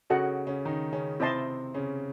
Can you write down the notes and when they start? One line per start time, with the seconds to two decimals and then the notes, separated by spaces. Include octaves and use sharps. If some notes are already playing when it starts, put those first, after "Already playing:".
0.10 C#3 C#4 F#4 A4 D#5 F#5
0.47 C#3 C#4
0.65 D#3 D#4
0.92 C#3 C#4
1.20 C3 C4 E4 C5 D#5 A5 C6
1.74 C#3 C#4